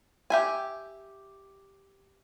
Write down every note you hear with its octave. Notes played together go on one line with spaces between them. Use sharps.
G4 E5 G#5